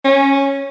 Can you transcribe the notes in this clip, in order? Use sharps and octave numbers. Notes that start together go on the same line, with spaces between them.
C#4